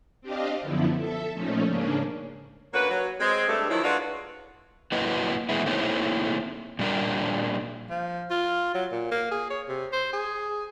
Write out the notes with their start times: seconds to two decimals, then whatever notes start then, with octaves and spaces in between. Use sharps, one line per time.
0.21 C4 D4 G4 D#5 F5
0.61 F#2 D3 F3 B3 E4
0.96 A4 E5
1.34 A#2 F3 A3 C#4 D#4
1.67 G#2 C#3 A#3 C#4 D4
2.74 D2 A#3 C#4 F#4 B4
2.90 F#3
3.20 G#3 C4
3.49 G2 A3
3.69 D#3 F3 F#3 G#3 E4
3.83 G#3 D4 F4 F#4 B4 D5
4.92 F#3 A#3 E4 F#4 B4 D#5
5.49 E3 G#3 B3 E4
5.66 A3 A#3 C4 D#4 E4 C#5
6.79 A#2 G3 D4 A#4
7.90 F3
8.30 F4
8.74 F#3
8.92 A#2
9.12 A#3
9.31 G#4
9.50 C#5
9.69 C3
9.93 C5
10.13 G#4